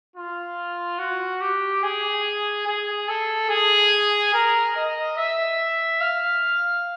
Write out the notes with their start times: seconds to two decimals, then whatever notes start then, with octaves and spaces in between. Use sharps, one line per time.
0.16 F4
0.99 F#4
1.41 G4
1.83 G#4
2.67 G#4
3.08 A4
3.50 G#4
4.34 A#4
4.76 D#5
5.18 E5
6.01 F5